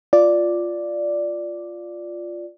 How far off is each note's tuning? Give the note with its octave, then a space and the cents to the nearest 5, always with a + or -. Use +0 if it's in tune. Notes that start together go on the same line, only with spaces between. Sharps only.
F4 +0 D5 +0